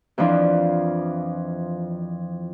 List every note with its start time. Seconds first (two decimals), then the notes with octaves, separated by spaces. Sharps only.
0.18 F2 E3 F3 D4